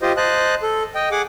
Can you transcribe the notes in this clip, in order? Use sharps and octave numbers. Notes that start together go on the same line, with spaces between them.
F4 G4 C5 D#5
C5 D#5 A5 F#6
A4
D#5 G5
G#4 F#5 D6